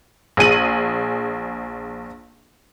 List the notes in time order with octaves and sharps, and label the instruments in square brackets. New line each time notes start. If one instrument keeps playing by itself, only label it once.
[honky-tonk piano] A#1 G#4 D#7 F#7